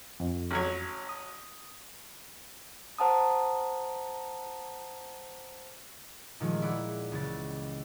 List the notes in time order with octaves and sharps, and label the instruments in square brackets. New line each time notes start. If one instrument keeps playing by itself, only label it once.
[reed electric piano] F2
[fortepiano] A1 F#3 C#5
[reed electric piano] D#6
[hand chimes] C5 F#5 A5 A#5 D#6
[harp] A#2 D#3 F3 G3 G#3
E4 G#4 D5 F#5
C#2 E3 A6